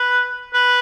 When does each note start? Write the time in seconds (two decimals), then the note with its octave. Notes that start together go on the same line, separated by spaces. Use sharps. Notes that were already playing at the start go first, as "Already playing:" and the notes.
Already playing: B4
0.53 B4